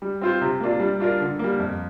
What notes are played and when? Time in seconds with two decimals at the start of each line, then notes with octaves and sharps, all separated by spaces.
0.02 G3
0.21 C4 F4 C5
0.42 C3
0.61 A#3 D4 F4
0.80 G3
1.00 D4 F4 A#4
1.20 D3
1.39 G3 A#3
1.59 F2